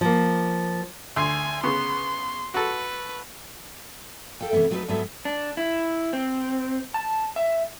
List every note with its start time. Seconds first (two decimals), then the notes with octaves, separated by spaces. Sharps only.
0.01 F3 A#3
1.16 D2 G#5 C6
1.64 C#3 B3 C6
2.54 F#4 A4 B4
4.41 A4 F5 G5
4.53 C3 E3 F3 A3 B3
4.70 F#3 A3 B3 D#4 A4 B4
4.88 G#2 F#3 G3 B3 A4 E5
5.25 D4
5.57 E4
6.13 C4
6.94 A5
7.36 E5